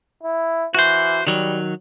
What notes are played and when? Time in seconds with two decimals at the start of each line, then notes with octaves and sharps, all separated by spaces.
0.23 E4
0.75 E3 F#4 C5
1.27 D#3 F#3 G3